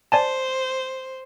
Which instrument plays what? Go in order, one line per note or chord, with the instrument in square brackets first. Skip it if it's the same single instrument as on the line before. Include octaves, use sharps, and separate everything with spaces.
[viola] C5 [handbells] D5 G#5 A5